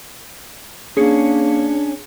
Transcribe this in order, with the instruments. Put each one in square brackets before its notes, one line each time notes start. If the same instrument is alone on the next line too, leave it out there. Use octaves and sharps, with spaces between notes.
[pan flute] A#3 [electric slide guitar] C#4 [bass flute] D4 [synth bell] G#4 C#7